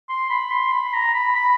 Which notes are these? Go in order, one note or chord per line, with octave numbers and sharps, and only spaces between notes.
C6
B5
C6
B5
A#5
B5
B5